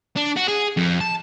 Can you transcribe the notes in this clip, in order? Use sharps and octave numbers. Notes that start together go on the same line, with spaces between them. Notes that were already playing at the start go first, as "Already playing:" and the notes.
D4
F#4
G#4
F2
A5